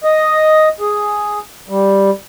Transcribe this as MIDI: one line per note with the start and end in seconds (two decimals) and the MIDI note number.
0.04 0.69 75
0.80 1.39 68
1.69 2.10 55